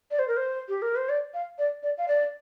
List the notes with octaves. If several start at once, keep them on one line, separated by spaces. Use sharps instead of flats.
D5
C5
A#4
C5
G4
A#4
C5
D5
F5
D5
D5
F5
D5